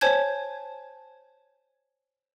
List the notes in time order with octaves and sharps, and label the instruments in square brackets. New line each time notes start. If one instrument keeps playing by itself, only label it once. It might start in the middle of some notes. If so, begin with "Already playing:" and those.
[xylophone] C5 C#5 G#5 A5 G6 G#6